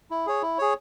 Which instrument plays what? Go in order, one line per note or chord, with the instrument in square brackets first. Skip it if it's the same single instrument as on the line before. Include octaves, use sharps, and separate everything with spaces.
[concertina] E4
G#4 C#5
E4
G#4 C#5